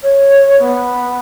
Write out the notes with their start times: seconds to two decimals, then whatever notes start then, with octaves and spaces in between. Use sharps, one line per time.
0.02 C#5
0.59 B3